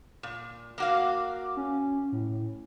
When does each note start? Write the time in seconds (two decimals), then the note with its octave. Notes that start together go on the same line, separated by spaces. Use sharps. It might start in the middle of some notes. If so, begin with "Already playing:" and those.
0.23 A#2
0.78 A#3 F#4 F5 D6
1.57 C#4
2.12 A2